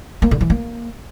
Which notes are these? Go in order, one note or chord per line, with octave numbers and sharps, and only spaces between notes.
A#3
D3
E3
A#3